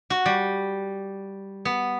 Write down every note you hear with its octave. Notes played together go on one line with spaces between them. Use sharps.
F#4
G3
B3